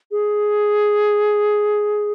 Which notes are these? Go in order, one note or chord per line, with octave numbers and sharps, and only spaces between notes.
G#4